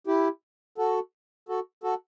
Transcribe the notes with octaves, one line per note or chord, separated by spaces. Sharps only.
E4 G4
F#4 A4
F#4 A4
F#4 A4